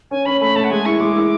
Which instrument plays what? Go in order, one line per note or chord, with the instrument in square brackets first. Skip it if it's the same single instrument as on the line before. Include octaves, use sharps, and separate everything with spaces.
[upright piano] C#4 [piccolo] G#5
[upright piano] C#4 [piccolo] B5
[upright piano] A3 [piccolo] B5
[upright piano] A3 [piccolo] A5
[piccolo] F#5
[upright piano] G#3 [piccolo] G#5
[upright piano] E4 [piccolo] C#6
[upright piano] G#3 [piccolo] D6
[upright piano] E4